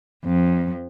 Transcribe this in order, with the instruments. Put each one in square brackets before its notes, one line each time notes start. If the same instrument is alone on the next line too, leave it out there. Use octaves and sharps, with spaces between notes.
[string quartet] F2